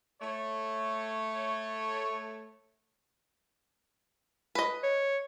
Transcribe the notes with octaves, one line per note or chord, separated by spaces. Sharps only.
A3 C#5
B4 D#5
C#5